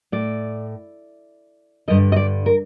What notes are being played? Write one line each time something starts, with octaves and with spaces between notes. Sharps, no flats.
A2 D5
G2 D3 D#5
D#5
D5
A#4